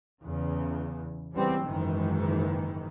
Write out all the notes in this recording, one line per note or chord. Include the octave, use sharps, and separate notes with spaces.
E2 C#3
C#3 E3 G3 B3 C4
F#1 G#2 D#3 E3